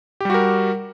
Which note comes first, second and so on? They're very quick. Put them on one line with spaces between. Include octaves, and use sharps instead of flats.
G4 G3 F#4 A#4